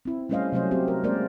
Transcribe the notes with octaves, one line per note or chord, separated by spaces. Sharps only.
C4 E4
G3 A3 C#4 C5 D#5 F5
C3 F#3 A3 C#4 C5 D#5
C4 F#4 G4
A#4
G#3 A#3 C#4 A#4 C5 D5